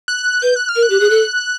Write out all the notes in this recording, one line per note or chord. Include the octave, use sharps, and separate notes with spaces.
F#6
B4 G6
F#6
F6
A#4
F#6
G4
G#4
A4